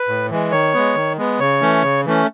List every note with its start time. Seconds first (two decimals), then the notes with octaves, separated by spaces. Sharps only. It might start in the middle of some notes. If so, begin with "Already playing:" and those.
Already playing: B4
0.08 A2
0.30 E3 G#3
0.51 D#3 C#5
0.74 G#3 B3
0.95 D#3
1.17 G#3 B3
1.39 C#3 C#5
1.61 E3 A3 C#4
1.83 C#3
2.05 E3 A3 C#4